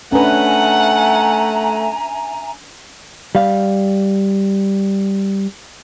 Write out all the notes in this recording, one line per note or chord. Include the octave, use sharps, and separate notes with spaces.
A3 C#4 D4 B4 E5 F#5 G#5 A#5
G3 F5